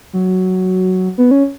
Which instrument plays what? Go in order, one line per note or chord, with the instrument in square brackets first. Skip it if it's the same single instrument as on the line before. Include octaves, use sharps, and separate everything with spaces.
[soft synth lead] F#3
B3
C#4